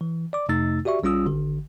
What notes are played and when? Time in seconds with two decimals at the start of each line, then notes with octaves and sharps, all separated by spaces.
0.01 E3
0.33 D5 D6
0.49 F2 C3 A3 D#4 E6 A6
0.85 F#4 G4 D5 E5 C#6
1.03 A#1 G3 C#4 F4 D#6 E6
1.25 G#1 D3